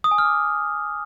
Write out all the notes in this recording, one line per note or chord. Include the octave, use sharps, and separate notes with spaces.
D#6
G#5
F6
D6